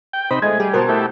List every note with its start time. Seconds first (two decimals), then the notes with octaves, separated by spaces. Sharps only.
0.13 G5
0.31 C3 D#4 C5 B5
0.42 G#3 A3 D#5 G#6
0.60 G3 G#4
0.74 B2 A#4 C5 A5
0.89 A3 E4 G4